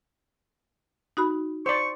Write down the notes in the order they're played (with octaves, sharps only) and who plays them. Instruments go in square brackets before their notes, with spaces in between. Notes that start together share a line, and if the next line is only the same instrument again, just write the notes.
[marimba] D#4 F#4 B5
[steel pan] C5 D5 [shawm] C#6